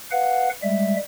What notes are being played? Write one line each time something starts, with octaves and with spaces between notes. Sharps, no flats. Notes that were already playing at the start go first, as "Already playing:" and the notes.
B4 F5 F#5
G3 G#3 E5